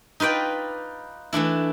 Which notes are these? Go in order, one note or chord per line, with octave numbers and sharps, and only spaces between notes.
D#4 F4 B4 D5 G5
E3 A3 D4 E4